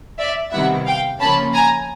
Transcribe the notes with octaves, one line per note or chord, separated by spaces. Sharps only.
D5 E5
C3 D#3 G3 B3 E4 E5 F#5
F5 G5
C#3 F3 A#3 C#4 A5 B5
G#5 A#5